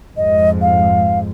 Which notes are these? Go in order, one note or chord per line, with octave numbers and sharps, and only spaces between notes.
F2 G#2 D#5
F5